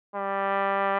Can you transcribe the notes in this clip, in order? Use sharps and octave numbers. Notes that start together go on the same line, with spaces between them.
G3